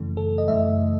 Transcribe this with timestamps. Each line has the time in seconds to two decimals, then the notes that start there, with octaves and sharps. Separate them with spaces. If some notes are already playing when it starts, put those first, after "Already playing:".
Already playing: F#2 C#3 E3 A3
0.17 A4
0.38 D#5
0.48 F#2 C#3 E3 A3 E5